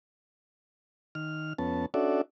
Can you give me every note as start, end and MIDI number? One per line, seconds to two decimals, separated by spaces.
1.15 1.53 51
1.15 1.53 89
1.58 1.86 41
1.58 1.86 59
1.58 1.86 61
1.58 1.86 81
1.94 2.21 61
1.94 2.21 62
1.94 2.21 66
1.94 2.21 69
1.94 2.21 74
1.94 2.21 76